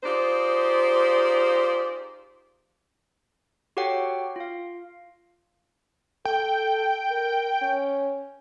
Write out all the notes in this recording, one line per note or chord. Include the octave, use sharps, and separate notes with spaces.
D#4 F4 G4 G#4 C5 D5
F#4 G4 A4 C#5 F#5 G5
F4 F5
A4 G5
A#4
C#4